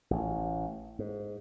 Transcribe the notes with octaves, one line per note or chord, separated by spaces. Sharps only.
A1
G#2